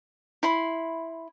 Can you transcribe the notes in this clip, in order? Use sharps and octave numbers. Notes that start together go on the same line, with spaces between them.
E4 B5 C6